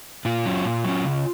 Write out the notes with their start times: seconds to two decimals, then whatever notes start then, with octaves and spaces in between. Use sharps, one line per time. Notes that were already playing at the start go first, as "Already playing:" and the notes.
0.25 A#2 F4
0.46 F#3 C#4
0.65 A#2
0.84 F#3 C#4
1.04 C#3